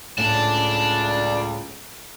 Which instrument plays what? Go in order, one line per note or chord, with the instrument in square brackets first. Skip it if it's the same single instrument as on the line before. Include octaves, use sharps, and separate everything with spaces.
[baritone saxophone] C#2 [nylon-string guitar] A2 [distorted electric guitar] D5 A5